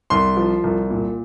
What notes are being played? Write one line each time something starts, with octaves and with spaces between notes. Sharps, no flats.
C2 C6
F3
C2
A#2